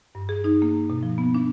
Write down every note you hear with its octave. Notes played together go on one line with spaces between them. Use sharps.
G2
G#4
D#4
A#3
B2
F3
B3
D4